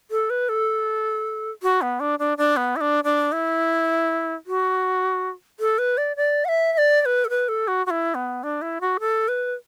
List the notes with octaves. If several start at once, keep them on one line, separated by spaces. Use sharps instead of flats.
A4
B4
A4
F#4
B3
D4
D4
D4
B3
E4
D4
D4
E4
F#4
A4
B4
D5
D5
F#5
E5
E5
D5
D5
B4
A4
B4
A4
F#4
F#4
E4
B3
D4
E4
F#4
A4
B4